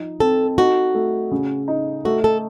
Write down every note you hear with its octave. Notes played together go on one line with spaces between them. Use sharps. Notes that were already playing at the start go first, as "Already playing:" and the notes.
Already playing: F3 D#4
C4 A4
D#4 F#4
A3
C#3
D#4
A3 F#4
A4